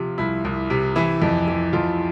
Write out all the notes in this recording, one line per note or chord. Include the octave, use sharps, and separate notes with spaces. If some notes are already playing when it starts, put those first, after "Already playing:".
Already playing: C3 F3 F4
C2 E4
C2
C3
E3 E4
F2
E3
F2 F4